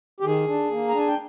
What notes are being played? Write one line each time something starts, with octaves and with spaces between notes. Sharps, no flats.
G4
D#3 G#4
D4
A#3
A#5
D4
G#5
G5